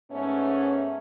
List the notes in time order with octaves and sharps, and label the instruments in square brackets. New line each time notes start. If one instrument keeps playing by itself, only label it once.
[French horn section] G#2 A3 B3 C#4